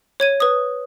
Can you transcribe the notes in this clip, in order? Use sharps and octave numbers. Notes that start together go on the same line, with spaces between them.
C#5 G#6 D#7
B4 D#6